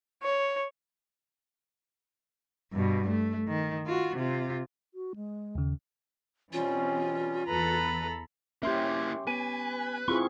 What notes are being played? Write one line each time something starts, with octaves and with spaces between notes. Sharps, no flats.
C#5
G2 B2
A3
D#3
F4 F#4
C3 F4
F#4
G#3
D#2 C#3
B2 E3 G3 C4 C#4 F4
E2 A4 B4 A#5 B5
A#3 C#4 E4 G4 E5 C6 G6
B3 B4 G#5
C4 E4 F4 G#4 C#6